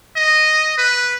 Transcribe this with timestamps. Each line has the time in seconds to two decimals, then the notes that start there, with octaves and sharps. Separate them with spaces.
0.16 D#5
0.78 B4